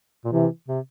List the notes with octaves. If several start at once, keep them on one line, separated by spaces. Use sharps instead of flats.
A#2
C3 E3
C3